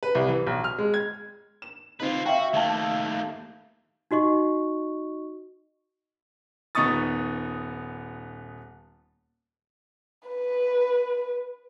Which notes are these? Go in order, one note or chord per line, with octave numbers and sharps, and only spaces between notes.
B4
C2
E3
B1
F6
G#3
G#6
E7
C4 D#4 F4 B4
F#4 E5 F5 G5
D#2 A3 F5 A5
D#4 F#4 D#5 C#6
D#1 B3 D#4 C#6 D#6 A6
B4